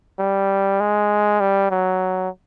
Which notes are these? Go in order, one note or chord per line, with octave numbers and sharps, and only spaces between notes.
G3
G#3
G3
F#3